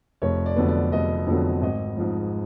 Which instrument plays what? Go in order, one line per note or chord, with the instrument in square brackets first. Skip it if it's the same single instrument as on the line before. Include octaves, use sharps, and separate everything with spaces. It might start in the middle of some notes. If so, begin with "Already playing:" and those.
[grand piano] F1 C#5
D5
F2 D3 F#3 B3
D5
F1 D#5
F2 D3 F#3 B3
G#1 D#5
G#2 F3